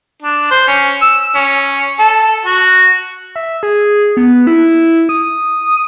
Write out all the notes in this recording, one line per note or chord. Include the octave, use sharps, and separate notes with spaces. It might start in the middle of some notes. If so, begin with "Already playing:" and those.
D4
C5
C#4
E6
C#4
A4
F#4
E5
G#4
B3
E4
D#6